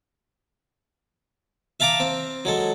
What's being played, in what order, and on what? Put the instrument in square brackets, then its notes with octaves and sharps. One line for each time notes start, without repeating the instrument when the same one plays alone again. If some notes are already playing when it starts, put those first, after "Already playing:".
[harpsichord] E5 F5 A5 A#5 D6
C4
F#3 G#3 A4